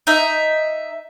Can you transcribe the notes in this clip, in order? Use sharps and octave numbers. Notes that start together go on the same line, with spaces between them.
D#4 E5